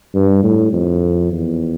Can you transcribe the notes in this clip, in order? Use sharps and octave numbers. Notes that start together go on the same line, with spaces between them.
G2
A2
F2
E2